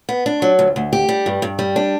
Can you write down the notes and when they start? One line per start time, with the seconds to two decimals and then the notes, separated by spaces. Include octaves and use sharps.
0.09 B3
0.26 D4
0.42 F#3
0.59 D2
0.76 D2
0.93 G4
1.09 G3
1.26 G2
1.42 G2
1.59 G3
1.76 D4